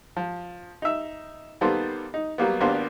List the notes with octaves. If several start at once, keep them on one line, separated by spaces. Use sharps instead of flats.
F3
D#4 E5
D#3 G3 A#3 B3 A4 C5
D#4
F#3 G3 A#3 B3
G#1 A#3 B3 D4 G4 C5